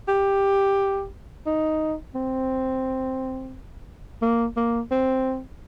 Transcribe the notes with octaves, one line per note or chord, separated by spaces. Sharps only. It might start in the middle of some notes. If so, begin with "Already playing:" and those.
G4
D#4
C4
A#3
A#3
C4